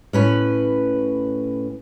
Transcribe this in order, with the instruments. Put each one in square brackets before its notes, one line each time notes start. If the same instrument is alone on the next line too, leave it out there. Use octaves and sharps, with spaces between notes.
[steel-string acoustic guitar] A2 C#4 B4